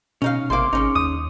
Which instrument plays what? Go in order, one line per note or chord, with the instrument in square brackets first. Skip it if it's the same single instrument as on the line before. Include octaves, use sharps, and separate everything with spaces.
[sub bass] B2 [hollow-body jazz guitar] C#4 D#4 F5
[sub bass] G#1 [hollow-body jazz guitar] C3 A#3 [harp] C6 D6
[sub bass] G#1 [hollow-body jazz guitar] C#3 C#4 D#4
[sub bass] D#2 [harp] D#6